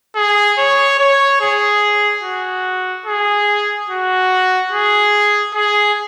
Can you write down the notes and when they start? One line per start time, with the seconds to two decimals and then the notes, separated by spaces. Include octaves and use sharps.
0.15 G#4
0.58 C#5
0.99 C#5
1.41 G#4
2.23 F#4
3.06 G#4
3.90 F#4
4.72 G#4
5.55 G#4